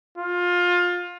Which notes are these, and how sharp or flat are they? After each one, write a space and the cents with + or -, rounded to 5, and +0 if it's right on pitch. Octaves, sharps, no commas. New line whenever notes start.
F4 +20